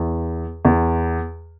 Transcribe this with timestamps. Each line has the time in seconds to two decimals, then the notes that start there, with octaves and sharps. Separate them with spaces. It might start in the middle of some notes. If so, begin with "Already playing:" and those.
Already playing: E2
0.65 E2